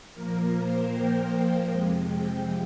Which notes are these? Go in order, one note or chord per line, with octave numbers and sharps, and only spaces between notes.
A#2 F3 A#3 A#4
C5
G5
F2 C3 F3 G#3
G5